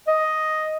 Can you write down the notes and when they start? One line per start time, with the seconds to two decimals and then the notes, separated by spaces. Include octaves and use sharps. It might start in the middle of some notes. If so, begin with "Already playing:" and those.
0.08 D#5